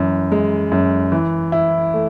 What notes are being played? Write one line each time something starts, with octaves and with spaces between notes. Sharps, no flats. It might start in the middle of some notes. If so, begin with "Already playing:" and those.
Already playing: F#2 E3
G#3
F#2
E3
E4
A3